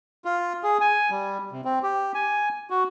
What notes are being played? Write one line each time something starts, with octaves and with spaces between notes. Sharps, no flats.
F4
G#4
G#5
G3
C3
C4
G4
G#5
F#4